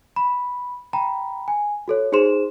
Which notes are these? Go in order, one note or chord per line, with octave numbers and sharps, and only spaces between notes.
B5
G5 A#5 B5
G#5
F#4 A4 C#5
D#4 G#4 C5 C6 E7